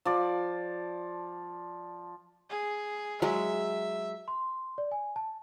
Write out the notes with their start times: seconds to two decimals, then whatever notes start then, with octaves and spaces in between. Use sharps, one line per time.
0.05 F3 D5
2.50 G#4
3.22 F#3 G#3 E5
4.28 C6
4.78 D5
4.92 G#5
5.16 A5